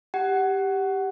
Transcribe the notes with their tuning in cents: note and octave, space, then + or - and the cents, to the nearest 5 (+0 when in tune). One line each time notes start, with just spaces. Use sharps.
G4 +0 F#5 +15